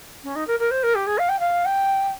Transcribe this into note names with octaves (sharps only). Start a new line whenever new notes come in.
C#4
D#4
A#4
A#4
C5
A#4
G4
G#4
F5
G5
F5
G5